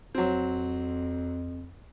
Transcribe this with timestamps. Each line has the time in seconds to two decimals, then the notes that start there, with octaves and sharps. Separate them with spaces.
0.15 F2 F#3 C4